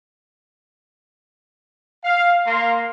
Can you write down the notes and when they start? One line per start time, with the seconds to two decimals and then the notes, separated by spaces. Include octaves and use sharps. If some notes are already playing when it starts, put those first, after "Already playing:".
2.04 F5
2.46 A#3 F5 C6